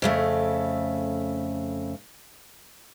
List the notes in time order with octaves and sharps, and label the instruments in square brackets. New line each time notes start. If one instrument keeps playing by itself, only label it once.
[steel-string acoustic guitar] F2 C#3 A3